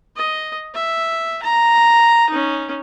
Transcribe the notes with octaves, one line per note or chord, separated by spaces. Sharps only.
D#5
E5
A#5
C#4 D#4